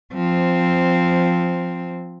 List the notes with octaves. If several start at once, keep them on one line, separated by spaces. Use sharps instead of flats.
F3 C4